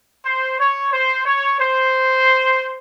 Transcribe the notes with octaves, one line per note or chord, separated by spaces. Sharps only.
C5
C#5
C5
C#5
C5